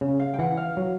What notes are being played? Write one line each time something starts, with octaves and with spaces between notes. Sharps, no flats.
C#3
F5
G5
E3 F#5
F5
F#3